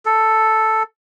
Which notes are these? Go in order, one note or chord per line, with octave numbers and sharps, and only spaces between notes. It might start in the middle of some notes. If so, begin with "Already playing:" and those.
A4